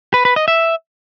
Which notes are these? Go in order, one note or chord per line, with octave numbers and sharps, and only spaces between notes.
B4
B4
D#5
E5